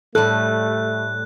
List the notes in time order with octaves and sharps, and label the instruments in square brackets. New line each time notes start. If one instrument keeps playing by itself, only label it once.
[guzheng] A2 G3 [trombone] A3 [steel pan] A4 [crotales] F#6